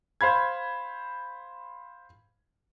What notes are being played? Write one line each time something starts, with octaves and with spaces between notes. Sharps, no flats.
C5 F5 B5 G#6